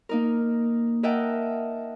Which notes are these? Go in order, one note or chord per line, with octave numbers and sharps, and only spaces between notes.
A#3 D#4 A#4
A#4 D#5 E5 F#5 G5 A5